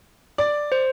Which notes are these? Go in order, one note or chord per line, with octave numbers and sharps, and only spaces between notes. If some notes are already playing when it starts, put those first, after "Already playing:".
D5
C5